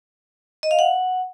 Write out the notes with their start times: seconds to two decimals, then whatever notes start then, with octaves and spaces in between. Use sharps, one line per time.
0.63 D#5
0.71 F5
0.79 F#5